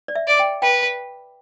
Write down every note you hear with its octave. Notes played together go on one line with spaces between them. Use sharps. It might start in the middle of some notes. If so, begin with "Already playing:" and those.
D5
E5
D5
G5
B4 G5